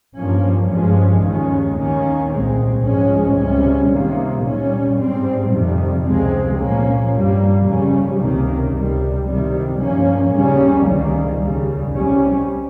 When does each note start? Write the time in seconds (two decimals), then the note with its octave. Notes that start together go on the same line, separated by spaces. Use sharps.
0.17 G2 F3 A#3 C#4
0.71 G2 F3 G#3 C#4
1.24 D#2 D#3 G#3 C#4
1.78 D#2 D#3 A#3 C#4
2.31 C2 A#2 G#3 C4
2.85 G#2 F3 G#3 C#4
3.39 C#2 C3 G3 C#4
3.92 C3 D#3 A#3
4.45 A#2 G3 C#4
4.99 G#2 G3 C4
5.52 F2 C3 D#3 G3
6.06 C#2 C3 F3 G#3 C4
6.59 A#2 F3 A#3 C#4
7.13 G2 G3 A#3
7.66 F2 C#3 G3 C#4
8.20 C#2 C3 D#3 A#3
8.73 C#2 C3 G3
9.27 C2 C3 D#3 G3
9.81 G2 F3 A#3 C#4
10.34 D#2 C#3 G3 A#3 C#4
10.88 C#2 C3 D#3 G3 A#3
11.41 D#2 C#3 G3
11.95 C2 C3 G3 C#4